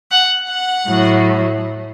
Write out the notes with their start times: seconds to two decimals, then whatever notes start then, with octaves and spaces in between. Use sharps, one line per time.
0.11 F#5
0.49 F#5
0.87 A2 F#3